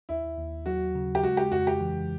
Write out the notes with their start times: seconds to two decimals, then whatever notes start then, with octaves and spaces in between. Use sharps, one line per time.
0.09 D#2 E4
0.38 D#2
0.66 F#3 F#4
0.95 C#3
1.15 G4
1.23 G#3 F#4
1.37 G4
1.52 F2 F#4
1.67 G4
1.81 E3